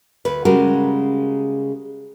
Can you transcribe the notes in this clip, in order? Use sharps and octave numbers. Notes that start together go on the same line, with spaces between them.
D2 B4
C#3 G3 G#3 F#4 A#4